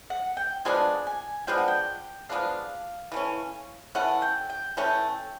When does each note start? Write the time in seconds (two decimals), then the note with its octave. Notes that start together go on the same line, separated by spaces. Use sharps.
0.10 F#5
0.37 G5
0.65 F3 G#3 B3 D4 G#5
1.07 G#5
1.47 F3 G#3 B3 D4 G5
1.58 F#5
1.68 G5
2.29 F3 G#3 B3 D4 F5
3.12 E3 A3 C#4
3.95 E3 A3 C#4 F#5
4.22 G5
4.50 G5
4.77 E3 A3 C#4 G5